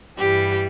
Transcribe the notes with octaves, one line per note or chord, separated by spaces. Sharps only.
G2 E3 G3 G4